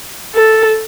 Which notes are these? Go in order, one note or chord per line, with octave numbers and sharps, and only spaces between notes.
A4